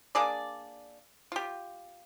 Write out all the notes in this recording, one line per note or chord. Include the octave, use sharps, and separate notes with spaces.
A#3 D4 G#4 D5
F4 G4